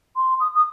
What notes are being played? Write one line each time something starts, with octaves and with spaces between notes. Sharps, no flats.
C6
D#6
D#6